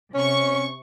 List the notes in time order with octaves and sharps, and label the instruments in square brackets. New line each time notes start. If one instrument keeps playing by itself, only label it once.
[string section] C3 C#6 [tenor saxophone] C#4